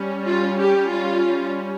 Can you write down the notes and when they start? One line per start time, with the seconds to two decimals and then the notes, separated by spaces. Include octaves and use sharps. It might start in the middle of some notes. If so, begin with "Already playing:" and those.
Already playing: G3 C#4
0.27 F4
0.60 G4
0.91 F4